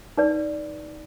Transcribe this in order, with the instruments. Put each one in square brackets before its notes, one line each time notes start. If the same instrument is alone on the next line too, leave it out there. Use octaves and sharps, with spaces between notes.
[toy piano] D#4 B4 D5